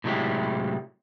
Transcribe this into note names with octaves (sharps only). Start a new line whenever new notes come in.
A2 C3 F#3 G#3 E4 G4